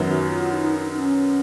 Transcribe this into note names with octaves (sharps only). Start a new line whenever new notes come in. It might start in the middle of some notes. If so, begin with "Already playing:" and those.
Already playing: F#2 D#3 F#3 B3
F#4
F4
D#4
D#4
D#4
C#4